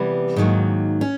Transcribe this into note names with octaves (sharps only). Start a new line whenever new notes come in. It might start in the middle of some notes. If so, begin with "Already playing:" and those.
Already playing: C3 E3 G3 B3
G#2 D#3 F#3 A#3
C#4